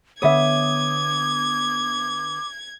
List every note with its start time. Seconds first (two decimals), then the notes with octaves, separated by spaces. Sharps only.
0.22 D3 B3 C#5 E5 D6 D#6 G#6